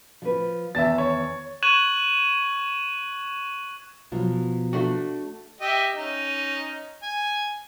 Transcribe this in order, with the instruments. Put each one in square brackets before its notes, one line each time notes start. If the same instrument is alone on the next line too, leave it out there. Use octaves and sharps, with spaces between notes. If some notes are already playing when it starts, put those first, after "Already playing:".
[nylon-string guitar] F3 B4
[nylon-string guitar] E2 D#3 A5 [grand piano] E5 A6
[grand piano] C#5
[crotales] C#6 F#6 G#6 D#7 E7 F#7
[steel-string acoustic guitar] B2 F3 F#3
[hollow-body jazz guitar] A3 D4 F#4
[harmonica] G4 D#5 E5
C#4 D#4
G#5